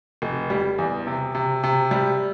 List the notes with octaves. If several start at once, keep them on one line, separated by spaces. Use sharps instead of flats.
F1
G3
E2
C3
C3
C3
G3